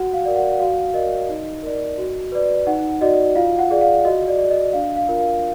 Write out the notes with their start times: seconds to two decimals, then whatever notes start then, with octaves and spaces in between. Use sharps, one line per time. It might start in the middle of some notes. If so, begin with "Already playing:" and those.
Already playing: F#4 F#5
0.13 F5
0.25 A#4 D5
0.36 F#5
0.51 F#5
0.59 F#4 F5
0.93 A#4 D5 D#5
1.29 D#4
1.63 A#4 D5
1.98 F#4
2.32 B4 D5
2.67 D#4 F#5
3.01 F#4 D5 D#5
3.35 F4 F5
3.59 F#5
3.70 G#4 D5
3.81 F5
4.05 F#4 D#5
4.28 D5
4.39 D5
4.50 D#5
4.73 D4 F5
4.96 F5
5.08 F4 A#4
5.19 F5